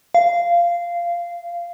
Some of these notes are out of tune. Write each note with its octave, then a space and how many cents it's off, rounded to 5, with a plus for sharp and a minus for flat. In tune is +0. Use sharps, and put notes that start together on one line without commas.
F5 -15